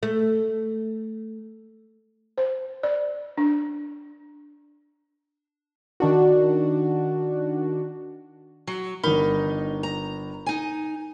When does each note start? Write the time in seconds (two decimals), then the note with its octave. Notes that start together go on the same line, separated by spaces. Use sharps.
0.03 A3
2.38 C5
2.83 D5
3.37 D4
6.00 D#3 D4 F#4
8.67 F#3
9.04 G1 D#4 A#4 B5
9.83 A#5
10.46 D#4 G#5